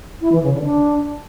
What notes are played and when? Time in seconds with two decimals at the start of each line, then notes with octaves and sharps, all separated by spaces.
0.21 E4
0.32 E3
0.43 C#3
0.54 D3
0.64 D4